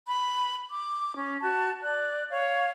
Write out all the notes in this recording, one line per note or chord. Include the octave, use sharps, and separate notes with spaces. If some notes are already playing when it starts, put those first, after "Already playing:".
B5
D6
C#4
F#4 A5
D5 F#6
C#5 F5